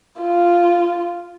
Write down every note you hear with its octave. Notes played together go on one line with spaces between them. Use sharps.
F4